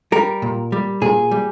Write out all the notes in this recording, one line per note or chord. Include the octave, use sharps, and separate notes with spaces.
G3 A#4
A#2
G3
A#2 G#4
G3